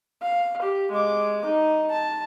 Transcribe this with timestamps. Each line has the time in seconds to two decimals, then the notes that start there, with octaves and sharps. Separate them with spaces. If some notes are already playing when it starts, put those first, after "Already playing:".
0.22 F5
0.62 G4
0.92 G#3 D6
1.45 D#4
1.90 A5